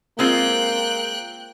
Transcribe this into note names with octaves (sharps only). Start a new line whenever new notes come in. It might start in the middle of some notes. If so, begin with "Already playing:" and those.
G#3 A#3 C4 F4 G5 F#6